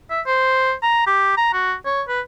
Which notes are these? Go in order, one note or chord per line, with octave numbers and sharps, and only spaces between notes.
E5
C5
A#5
G4
A#5
F#4
C#5
B4